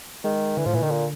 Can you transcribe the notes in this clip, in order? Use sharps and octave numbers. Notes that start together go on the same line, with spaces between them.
D#3 G#3
D3 E3
A2 F3
A#2 E3
D3 D#3
A#2